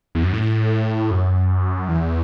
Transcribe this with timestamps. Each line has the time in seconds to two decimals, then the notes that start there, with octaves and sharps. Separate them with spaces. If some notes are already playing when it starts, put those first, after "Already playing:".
0.15 E2
0.23 F#2
0.33 A2
1.11 F#2
1.88 E2